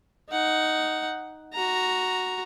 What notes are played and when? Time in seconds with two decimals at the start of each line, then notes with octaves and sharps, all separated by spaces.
0.30 D#4 F#5
1.54 F#4 A#5